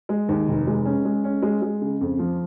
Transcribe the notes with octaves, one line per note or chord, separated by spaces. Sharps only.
G#3
D#2
F1
G#3
C#4
G#3
C#4
G#3
G#3
C#3
F2
F3